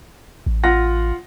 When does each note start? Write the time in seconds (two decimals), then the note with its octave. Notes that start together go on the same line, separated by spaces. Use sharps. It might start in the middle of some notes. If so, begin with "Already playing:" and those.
0.46 A1
0.63 F4 F#5 A#6